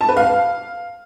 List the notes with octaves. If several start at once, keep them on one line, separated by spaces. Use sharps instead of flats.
A5
B4
F5